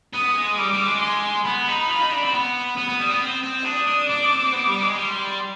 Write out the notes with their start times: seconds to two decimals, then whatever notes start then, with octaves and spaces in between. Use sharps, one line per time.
0.14 B3 D#6
0.35 G#3
0.58 G3 D6
0.73 G3
0.87 G#3
1.02 C6
1.46 B3 B5
1.68 D#4
1.90 F4 B5
2.01 D#4
2.11 D4
2.23 C4
2.34 B3
2.77 B3 D#6
2.89 B3
3.00 G3
3.10 B3
3.21 C4
3.44 C4
3.65 D4 D#6
3.87 D4
4.09 D4 D6
4.31 C4
4.53 B3
4.67 G3
4.82 G#3
4.97 G3 C6